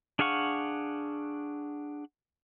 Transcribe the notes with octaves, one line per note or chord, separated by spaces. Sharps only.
D4 G#4 F5 F#5 C#6